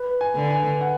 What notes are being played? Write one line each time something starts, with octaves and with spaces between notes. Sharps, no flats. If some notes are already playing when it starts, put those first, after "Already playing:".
Already playing: B4
G#5
D3
G#5
F#5